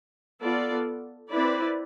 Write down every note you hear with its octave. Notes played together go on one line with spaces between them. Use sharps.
B3 F4 A4 D5
C4 E4 B4 D5